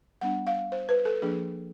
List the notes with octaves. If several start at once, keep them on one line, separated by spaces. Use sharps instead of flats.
G3 B3 D4 F#5
F5
C5
B4
A4
F3 A#3 D4 G#4